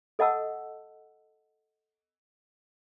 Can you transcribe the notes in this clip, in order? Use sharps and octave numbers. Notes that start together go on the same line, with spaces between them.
A4 D#5 F#5 A5 E6